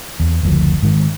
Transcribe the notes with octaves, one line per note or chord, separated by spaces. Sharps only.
E2
F#1 D2 F3
G#2 D#3